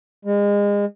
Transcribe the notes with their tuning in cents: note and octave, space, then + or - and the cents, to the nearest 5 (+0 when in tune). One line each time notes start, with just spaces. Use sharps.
G#3 -30